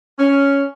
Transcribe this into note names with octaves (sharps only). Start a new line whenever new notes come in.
C#4